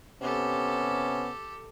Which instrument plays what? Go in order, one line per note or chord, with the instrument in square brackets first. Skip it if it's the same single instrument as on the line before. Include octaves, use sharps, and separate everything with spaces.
[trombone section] C3 B3 C#4 [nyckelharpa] G4 A4